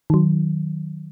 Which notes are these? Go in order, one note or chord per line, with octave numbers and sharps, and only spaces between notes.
D#3 F#3